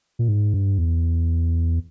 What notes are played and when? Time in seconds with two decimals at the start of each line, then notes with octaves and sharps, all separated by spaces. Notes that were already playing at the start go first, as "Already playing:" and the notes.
0.19 A#2
0.28 G#2
0.54 G2
0.78 E2